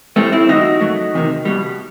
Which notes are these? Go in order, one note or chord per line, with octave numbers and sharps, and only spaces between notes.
A2 G3 A3 C4
C4 E4
G2 D#3 G3 D#4 F#4
F#2 F#3 A3
E2 C3 D#3
C2 B2 G3